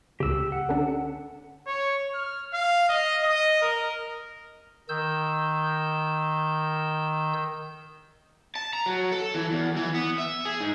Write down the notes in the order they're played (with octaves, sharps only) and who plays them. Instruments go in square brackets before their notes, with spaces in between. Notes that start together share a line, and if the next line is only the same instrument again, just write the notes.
[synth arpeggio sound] C#2 C#3 [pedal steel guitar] G4 E6
[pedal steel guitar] F#5
[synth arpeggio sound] D3 C#4 D4
[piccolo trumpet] C#5
F6
F5
D#5
D#5
A#4
[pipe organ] D#3 E6 G6
[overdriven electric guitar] A5
A#5
F#3
A4
E3
E2
E3
B3
E5
G#4
G#2